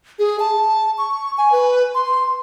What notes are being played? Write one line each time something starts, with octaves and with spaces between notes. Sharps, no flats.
G#4
A5
C#6
G#5
B4
C6